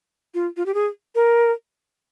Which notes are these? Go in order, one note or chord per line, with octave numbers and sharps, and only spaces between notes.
F4
F4
G4
G#4
A#4